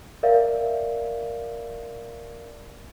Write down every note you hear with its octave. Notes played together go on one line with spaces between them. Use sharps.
A#4 D5 E5 F5